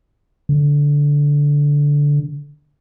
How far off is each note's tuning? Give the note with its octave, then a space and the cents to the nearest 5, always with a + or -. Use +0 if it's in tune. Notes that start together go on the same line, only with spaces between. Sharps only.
D3 -15